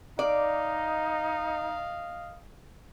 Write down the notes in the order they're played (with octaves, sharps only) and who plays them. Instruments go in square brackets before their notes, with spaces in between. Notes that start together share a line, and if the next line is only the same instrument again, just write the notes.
[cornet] D#4 [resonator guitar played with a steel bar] D5 [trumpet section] D#5 F5